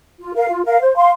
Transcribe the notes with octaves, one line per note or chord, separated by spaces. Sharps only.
F4
A#4 F5
F4
A#4 F5
C5
F5 C6